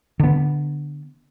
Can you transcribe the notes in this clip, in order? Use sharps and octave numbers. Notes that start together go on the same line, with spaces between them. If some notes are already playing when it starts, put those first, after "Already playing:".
D3 B3